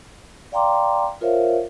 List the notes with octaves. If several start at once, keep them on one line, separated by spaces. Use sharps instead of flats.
D5 F5 G5 A#5 C6 D6
F4 A#4 C5 C#5 E5 F5